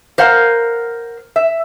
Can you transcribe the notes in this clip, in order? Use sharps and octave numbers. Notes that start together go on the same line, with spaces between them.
A#4 C5 F5 F#5
E5